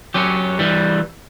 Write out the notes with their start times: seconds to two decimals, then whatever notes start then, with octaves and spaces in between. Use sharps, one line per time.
0.14 F#3 C#4 G4
0.59 E3 G3